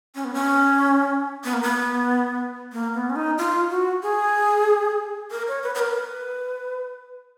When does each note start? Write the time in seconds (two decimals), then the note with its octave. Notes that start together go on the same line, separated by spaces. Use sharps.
0.15 C#4
0.25 B3
0.34 C#4
1.44 B3
1.54 A#3
1.62 B3
2.73 A#3
2.94 B3
3.10 C#4
3.16 D#4
3.38 F4
3.70 F#4
4.02 G#4
5.31 A#4
5.48 C#5
5.63 B4
5.75 B4
5.80 A#4
5.95 B4